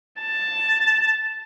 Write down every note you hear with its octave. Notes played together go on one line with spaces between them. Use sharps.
A5